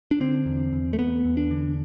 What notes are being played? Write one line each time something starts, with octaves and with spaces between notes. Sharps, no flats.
D4
D3 C4
E2
E2
A3
E2 B3
E2
D4
D3